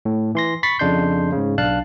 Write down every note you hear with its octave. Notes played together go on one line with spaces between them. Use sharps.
A2
E3 C6 A#6
B5 C#6 A6 B6 C7
F2 C#3 D4 D#5 C6 G6
G#2 C#3
B1 D4 F5 A5 F#6